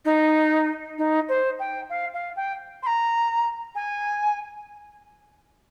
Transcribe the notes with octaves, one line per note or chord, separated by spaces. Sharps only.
D#4
D#4
C5
G5
F5
F5
G5
C6
A#5
G#5